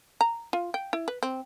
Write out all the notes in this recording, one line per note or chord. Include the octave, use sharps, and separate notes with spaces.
A#5
F4
G5
E4
B4
C4